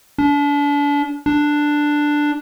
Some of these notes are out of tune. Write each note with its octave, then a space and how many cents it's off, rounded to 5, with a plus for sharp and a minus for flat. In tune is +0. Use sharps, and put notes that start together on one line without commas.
D4 -35
D4 +5